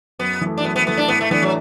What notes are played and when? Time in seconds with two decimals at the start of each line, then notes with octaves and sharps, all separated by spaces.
0.19 F#2 B3
0.41 E3 A3
0.58 D4
0.63 F#2 B3
0.76 B3
0.86 E3 A3 B3
0.97 D4
1.08 A2 B3
1.21 A3
1.31 E3 A3 B3 D4
1.42 F#3